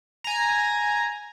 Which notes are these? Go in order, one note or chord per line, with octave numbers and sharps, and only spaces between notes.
G#5 A#5